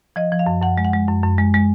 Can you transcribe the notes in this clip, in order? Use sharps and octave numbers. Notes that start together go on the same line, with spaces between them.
F3 D#5
F3
F5
F#2
F#2 F#5
G#3
F#5
G#3
F#2
F#2
G#3
G#3